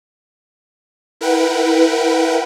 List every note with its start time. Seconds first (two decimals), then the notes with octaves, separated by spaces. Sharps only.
1.21 E4 A#4 B4 F#5 G5